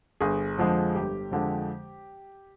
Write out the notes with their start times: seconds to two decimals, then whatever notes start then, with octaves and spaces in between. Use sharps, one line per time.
0.21 G1 G#4
0.58 F2 D3 F3 G#3
0.95 G1 G4
1.31 F2 D3 F3 G#3